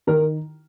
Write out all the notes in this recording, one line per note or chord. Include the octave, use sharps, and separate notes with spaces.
D#3 A#4